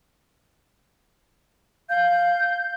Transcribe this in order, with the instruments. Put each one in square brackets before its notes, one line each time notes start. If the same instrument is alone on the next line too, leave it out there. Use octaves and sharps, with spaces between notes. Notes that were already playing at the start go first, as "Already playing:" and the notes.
[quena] F5 [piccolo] G6